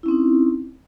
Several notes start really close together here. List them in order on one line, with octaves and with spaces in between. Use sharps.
E4 C#4 C4 D#4